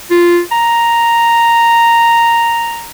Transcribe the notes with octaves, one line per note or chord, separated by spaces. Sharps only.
F4
A#5